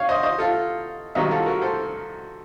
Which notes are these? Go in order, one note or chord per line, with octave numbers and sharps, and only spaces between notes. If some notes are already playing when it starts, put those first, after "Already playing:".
Already playing: C#5 F5
C5 D#5
C5 D#5
F4 A4
C2 C3 D#3 F#3 D#4 F#4
F4 A4
F#4 A#4
A4 C5